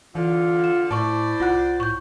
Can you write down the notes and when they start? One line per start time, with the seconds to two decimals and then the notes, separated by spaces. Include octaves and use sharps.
0.15 D3 E3 F4
0.64 E7
0.91 A2 E4 C5 D5 A5 C#6
1.40 C2 F4 F#5 F#6
1.80 A2 C#6 G6